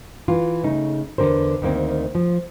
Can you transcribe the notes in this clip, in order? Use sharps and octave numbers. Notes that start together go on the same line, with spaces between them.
E3 F4
C#3 A3 D#4
E2 B2 D3 A#4 C5
D2 D#3 A#3 C4
F3